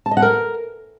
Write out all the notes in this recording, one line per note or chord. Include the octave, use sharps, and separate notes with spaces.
A5
D#5
F#5
A#4